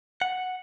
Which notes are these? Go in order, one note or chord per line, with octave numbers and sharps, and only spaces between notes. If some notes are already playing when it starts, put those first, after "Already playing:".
F#5